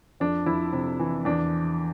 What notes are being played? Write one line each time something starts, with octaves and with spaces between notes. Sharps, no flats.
F2 D4
F2 E4
C3
E3
E2 D4